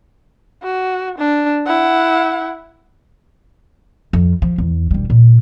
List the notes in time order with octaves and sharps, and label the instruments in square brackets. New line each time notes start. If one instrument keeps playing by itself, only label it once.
[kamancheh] F#4
D4
E4 F#5
[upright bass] F2
F3
E2
E1 G3
A#2